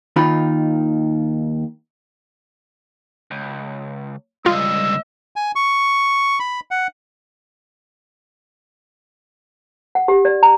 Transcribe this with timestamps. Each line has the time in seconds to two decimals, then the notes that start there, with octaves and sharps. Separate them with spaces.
0.16 D#2 D#3 D#4 F4 B5
3.31 C#2
4.46 C#2 G2 F4 D#5 E6
5.36 G#5
5.56 C#6
6.40 B5
6.71 F#5
9.95 F#5
10.08 G4
10.25 D5
10.43 A#5